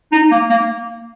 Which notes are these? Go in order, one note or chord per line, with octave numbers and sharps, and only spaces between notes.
D#4
A#3
A#3